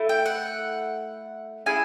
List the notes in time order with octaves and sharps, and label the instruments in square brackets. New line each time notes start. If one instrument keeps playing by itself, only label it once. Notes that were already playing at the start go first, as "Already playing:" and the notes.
Already playing: [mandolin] A3 E4
G5
F#5
C#4 E4 G#4 G#5